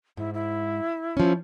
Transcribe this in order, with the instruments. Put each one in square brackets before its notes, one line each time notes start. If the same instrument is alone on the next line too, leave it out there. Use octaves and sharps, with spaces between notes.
[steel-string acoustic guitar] G#2 [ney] E4
[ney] E4
[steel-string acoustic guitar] F3 C#4